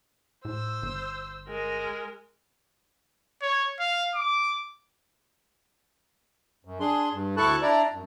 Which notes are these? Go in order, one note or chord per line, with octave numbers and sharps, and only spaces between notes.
A2 C5 E6
G1
G#3 A#4
C#5
F5
D6
F#2
D4 G#4 C6
G2
D2 E4 A4 A5 C#6 F#6
D4 E4 D5 A#5
F#2